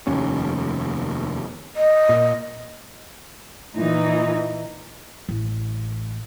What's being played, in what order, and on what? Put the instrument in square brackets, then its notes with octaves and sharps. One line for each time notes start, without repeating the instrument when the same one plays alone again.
[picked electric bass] F1 D#2 C#4
[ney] D#5
[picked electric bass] A#2
[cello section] A#2 E3 D#4
[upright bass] A1